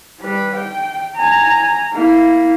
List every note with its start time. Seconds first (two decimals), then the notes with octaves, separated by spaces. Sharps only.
0.20 G3 B4
0.56 G5
1.15 G#5 A#5
1.93 A#3 E4